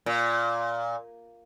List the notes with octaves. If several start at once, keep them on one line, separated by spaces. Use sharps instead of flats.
A#2